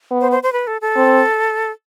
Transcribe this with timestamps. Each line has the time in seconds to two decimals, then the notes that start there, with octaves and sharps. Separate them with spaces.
0.11 B3
0.21 C5
0.31 C5
0.43 C5
0.53 B4
0.67 A4
0.81 A4
0.96 C4